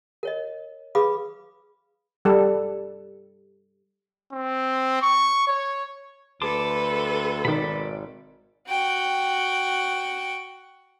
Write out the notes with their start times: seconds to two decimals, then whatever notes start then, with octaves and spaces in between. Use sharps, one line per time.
0.23 A#4 C#5 D#5
0.95 G#4 B4 F5 B5 D6 D#6
2.25 G3 A4
4.33 C4
5.02 C#6
5.47 C#5
6.42 D2 A4 B4 A5 C6 D6
7.45 G#1 B2 D#3 D5 B5
8.68 F#4 G5